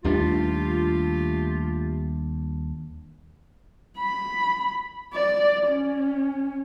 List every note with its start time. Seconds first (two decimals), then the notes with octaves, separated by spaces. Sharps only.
0.04 D#2 G3 A3 D4 F4 G4
3.98 B5
5.13 D5
5.67 C#4